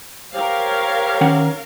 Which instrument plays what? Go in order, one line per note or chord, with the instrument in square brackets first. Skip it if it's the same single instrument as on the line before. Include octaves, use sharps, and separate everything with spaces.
[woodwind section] G4 C5 C#5 [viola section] A#4 F5
[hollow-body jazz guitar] D#3 C#4 F#5